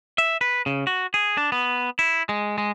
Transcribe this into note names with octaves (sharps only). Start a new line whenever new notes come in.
E5
B4
C#3
F#4
G#4
D4
B3
E4
G#3
G#3